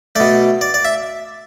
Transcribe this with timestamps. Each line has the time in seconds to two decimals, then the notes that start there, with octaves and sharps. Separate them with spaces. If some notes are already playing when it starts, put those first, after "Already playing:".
0.16 B2 A3 D5
0.61 D5
0.74 D5
0.85 E5